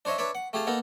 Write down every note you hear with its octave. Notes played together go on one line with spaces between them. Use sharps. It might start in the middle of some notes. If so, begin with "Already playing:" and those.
D4 C5 C#5 D#5 E5
D4 B4 C#5 D5 E5
F#5
A3 G4 G#4 F5 A5
A#3 B3 D#4 A4 A#4